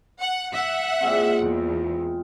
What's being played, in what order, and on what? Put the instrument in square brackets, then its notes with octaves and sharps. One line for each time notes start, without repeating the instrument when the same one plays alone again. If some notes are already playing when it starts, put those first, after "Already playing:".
[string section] F#5
E5 F#5
[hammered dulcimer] A#2 G#3 C4
[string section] E2